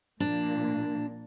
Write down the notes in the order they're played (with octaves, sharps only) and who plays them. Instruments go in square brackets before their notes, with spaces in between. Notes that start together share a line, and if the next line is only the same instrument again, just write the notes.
[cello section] A#2 F3 A#3 [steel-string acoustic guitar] D4